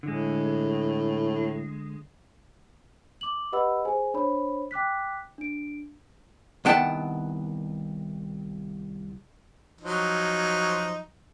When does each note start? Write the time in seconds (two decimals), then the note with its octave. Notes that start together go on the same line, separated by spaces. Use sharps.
0.03 A2 D3 G#3
3.21 D6 F#7
3.52 G4 B4 D#5 F#5 B5 E6
3.85 G#4 C5 G#5
4.14 D4 C5 C#5 B5
4.71 G5 D6 F#6 B6
5.38 D4 D7
6.65 C2 D#3 B3 F#5 G5 A5
9.81 F3 F#3 D#4